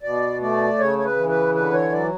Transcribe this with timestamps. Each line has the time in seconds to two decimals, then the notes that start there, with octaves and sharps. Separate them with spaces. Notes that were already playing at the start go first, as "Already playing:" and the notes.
0.03 B2 D5
0.41 A3 D5
0.79 C#3 C#5
0.98 C#5
1.05 B4
1.16 E3
1.29 B4
1.54 D3 B4
1.73 C#5
1.92 F#3 D5